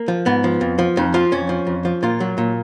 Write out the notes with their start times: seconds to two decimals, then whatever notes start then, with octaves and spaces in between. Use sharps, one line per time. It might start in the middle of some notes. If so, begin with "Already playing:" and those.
Already playing: A#3
0.08 F3
0.26 G#2 B3
0.44 F3
0.61 F2
0.79 F3
0.97 F2 D#4
1.14 F3 F4
1.32 F2 C#4
1.49 F3
1.67 F2
1.85 F3
2.03 A#2 F4
2.20 F#3
2.38 A#2